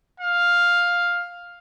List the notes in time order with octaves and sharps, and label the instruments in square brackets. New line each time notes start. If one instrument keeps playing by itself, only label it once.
[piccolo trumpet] F5